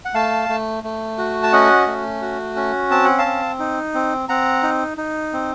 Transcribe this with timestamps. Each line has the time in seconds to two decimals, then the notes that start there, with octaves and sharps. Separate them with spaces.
0.05 F#5
0.14 A3 F5 A5
0.49 A3
0.84 A3
1.18 F#4
1.43 A5
1.52 C#4 D#5 F#5
1.87 A3
2.22 F#4
2.56 C#4
2.90 C4 A5
3.05 F#5
3.18 F5 A5
3.25 C4
3.59 D#4
3.94 C4
4.29 C4 F#5 A#5
4.63 D#4
4.98 D#4
5.33 C4